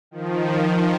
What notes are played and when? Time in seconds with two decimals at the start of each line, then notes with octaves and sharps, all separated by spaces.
0.11 D#3 F3
0.60 D#3